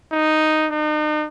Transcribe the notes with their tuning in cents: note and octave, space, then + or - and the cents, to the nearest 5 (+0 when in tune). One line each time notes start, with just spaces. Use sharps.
D#4 -5
D#4 -40